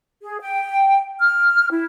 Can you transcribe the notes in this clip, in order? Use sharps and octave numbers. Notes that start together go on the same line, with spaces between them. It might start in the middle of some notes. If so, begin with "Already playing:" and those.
G#4
G5
F6
E4